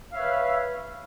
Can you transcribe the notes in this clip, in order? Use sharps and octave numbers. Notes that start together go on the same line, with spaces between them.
B4 C#5 E5 F5